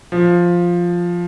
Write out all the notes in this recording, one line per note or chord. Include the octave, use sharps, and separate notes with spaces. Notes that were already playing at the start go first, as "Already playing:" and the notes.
F3